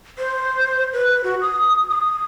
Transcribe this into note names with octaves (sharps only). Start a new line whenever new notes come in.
C5
B4
F#4
D#6
D#6